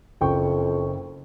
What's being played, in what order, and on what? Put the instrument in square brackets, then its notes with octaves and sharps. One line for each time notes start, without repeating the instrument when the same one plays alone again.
[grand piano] F#1 G5 C#6 [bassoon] F2